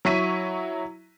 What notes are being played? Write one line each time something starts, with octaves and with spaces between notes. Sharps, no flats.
F#3 E4 C#6 B6 D#7